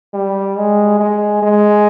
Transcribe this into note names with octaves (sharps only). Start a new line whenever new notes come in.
G3
G#3
G#3
G#3